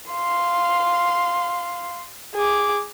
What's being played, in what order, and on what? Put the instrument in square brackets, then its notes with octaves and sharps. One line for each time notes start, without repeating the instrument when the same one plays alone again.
[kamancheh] F5 C6
G#4 D6